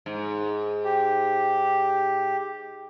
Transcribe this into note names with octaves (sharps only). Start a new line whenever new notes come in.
G#2
G4